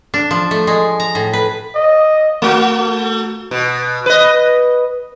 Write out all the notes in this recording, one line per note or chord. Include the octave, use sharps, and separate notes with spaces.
D4
F3
A3
G#3
A#5
A2
B4
D#5
A3 F#4
B2
B4 D#5